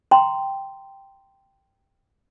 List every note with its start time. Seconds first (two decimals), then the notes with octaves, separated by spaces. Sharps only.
0.11 G5 A#5 C6